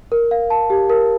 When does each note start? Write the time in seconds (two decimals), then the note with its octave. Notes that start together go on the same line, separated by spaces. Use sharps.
0.12 A#4
0.31 F5
0.50 A5
0.70 G4
0.90 A#4